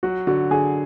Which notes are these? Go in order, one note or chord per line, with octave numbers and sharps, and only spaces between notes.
F#3 F#4
D3 F#4
D3 G#4